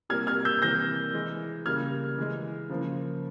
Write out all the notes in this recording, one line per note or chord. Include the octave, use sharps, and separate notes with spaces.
C3 G3 A#3 F6 G#6
F6 G#6
E6 G6
C3 E3 G3 A#3 G6 A#6
E3 G#3
C#3 G3 A#3 F6 G#6
E3 G#3
C#3 F3 A#3